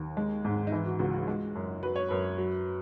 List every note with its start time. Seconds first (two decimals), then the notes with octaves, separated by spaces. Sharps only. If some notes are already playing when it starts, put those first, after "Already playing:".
Already playing: D#2
0.17 G#3
0.45 G#2
0.67 D#4
0.72 E3 E4
0.86 F#4
0.99 C#2 F#4
1.13 F#4
1.27 G#3
1.55 F#2
1.83 F#3 B4
1.96 C#5
2.08 F#2 B4
2.38 F#3